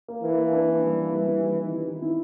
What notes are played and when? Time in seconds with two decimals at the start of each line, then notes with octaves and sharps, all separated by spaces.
0.08 A#3
0.23 E3 A#3
0.38 A#3
0.52 D4
0.68 D4
0.83 G3
0.98 A#3
1.13 G3
1.27 G3
1.42 D#3
1.58 D#3
1.73 E4
1.88 D#3
2.02 E4